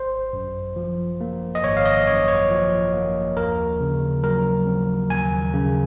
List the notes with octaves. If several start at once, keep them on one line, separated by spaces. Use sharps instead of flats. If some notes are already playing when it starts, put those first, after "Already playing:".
Already playing: G#1 C5
F#2
F3
A#3
D#5
G#1 C#5
F5
D#5
F#2 C#5
C#5
F3
A#3
D#2 A#4
C#3
F#3 A#4
C4
D#2 G#5
C#3